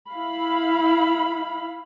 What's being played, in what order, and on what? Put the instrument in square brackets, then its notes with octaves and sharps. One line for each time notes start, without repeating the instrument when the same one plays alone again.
[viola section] E4 F5 B5